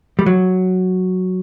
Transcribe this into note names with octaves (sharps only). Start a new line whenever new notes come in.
G3
F#3